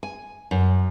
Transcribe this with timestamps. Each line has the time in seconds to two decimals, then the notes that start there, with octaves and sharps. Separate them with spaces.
0.03 G#5
0.51 F#2